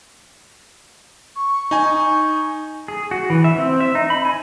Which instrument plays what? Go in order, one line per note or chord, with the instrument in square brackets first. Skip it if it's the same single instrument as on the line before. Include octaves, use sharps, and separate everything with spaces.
[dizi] C#6
[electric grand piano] D#4 G#5
[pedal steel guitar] G#4
F#4
E3
E5
C4
E5
D#4
B5
G#5